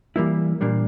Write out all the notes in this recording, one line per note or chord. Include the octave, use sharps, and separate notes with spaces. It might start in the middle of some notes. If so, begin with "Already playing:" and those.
E3 G3 A#3 E4
A#2 G3 A#3 D4